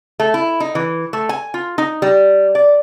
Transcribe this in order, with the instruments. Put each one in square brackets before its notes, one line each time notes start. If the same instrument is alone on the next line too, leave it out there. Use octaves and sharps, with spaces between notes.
[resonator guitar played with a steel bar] A3
E4
D#4
E3
A3
G#5
F4
D#4
G3
D5